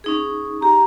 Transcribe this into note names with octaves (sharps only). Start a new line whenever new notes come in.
C#4 D#4 G#4
G4 A#5